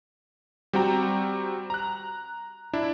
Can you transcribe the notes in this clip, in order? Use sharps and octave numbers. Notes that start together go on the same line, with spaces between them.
G3 C4 F#4 G5 A#5
A#5 F#6
D4 E4